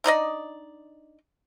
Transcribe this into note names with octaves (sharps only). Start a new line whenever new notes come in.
D4 D#4 D5 D#5